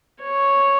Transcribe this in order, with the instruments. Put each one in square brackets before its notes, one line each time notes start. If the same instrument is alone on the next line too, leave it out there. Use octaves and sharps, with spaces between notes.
[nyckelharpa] C#5